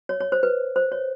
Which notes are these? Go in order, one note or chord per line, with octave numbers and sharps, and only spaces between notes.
C#5
C#5
C5
B4
C5
C#5